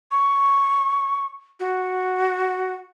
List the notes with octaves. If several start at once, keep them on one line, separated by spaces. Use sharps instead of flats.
C#6
F#4